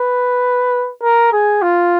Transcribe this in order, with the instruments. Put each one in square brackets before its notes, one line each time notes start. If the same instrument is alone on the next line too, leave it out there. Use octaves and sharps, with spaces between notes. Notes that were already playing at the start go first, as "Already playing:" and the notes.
Already playing: [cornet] B4
A#4
G#4
F4